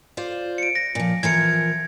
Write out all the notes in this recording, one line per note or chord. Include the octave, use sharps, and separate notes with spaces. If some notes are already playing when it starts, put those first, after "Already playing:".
F4 C5 D5
C#7 D7
A#6
A#2 F3
E3 F3 A#4 G#6 C#7